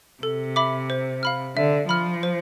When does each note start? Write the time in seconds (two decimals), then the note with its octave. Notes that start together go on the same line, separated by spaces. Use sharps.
0.23 C3 A4
0.56 E5 B5 D6
0.90 C5
1.23 F5 B5 F6
1.56 D3 E5
1.89 F3 B5 F6
2.23 C5